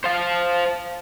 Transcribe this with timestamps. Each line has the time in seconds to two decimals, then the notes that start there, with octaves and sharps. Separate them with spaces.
0.04 C5 F5